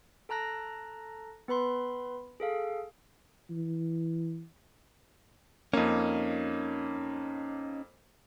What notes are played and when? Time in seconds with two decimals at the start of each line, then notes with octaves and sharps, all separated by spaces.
0.29 A4 A5 A#5 F#6 A#6
1.48 B3 B4 B5 C6
2.40 G#4 A4 F5
3.50 E3
5.73 F2 A#3 C#4 D#4